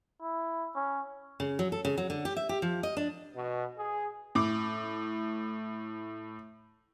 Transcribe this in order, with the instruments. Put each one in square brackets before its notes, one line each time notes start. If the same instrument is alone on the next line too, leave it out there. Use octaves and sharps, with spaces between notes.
[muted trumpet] E4
C#4
[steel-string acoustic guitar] C#3
F#3
A4
C#3
F#3
D3
G4
E5
G4
F3
D#5
D4
[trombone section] B2
G#4
[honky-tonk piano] A2 D6